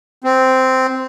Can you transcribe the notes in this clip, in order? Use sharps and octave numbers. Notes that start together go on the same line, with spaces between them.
C4